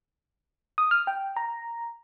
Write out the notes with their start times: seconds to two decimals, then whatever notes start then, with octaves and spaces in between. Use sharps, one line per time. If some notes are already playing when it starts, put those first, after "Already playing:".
0.78 D#6
0.91 F6
1.07 G5
1.36 A#5